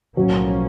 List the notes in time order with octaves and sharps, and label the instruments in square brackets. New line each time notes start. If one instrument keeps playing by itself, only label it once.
[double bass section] B1 A2 F3 A#3 C#4 [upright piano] F#3